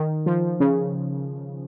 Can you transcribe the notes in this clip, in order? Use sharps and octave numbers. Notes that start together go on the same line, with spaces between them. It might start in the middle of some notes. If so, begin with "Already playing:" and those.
Already playing: D#3
F3
C#3